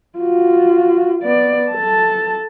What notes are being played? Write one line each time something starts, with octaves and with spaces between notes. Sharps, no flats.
F4 F#4
B3 D5
A4 A5